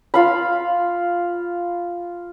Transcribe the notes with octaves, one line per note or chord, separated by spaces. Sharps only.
F4 F5 B5